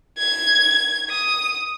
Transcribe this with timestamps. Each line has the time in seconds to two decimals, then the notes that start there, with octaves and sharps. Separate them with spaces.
0.19 G#6
1.10 D#6